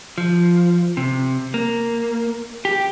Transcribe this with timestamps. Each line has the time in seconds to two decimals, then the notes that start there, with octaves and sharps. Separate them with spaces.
0.18 F3
0.97 C3
1.54 A#3
2.65 G4